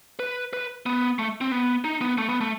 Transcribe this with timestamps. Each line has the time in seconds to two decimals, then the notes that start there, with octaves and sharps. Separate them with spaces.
0.19 B4
0.53 B4
0.86 B3
1.19 A3
1.41 C4
1.52 B3
1.84 D#4
2.01 B3
2.18 A3
2.29 B3
2.41 A3